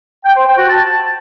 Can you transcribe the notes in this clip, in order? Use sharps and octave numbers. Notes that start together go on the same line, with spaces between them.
G5
C5
G5
F#4
A5